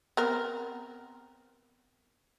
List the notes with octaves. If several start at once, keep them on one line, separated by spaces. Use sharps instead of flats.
B3 C4 A#4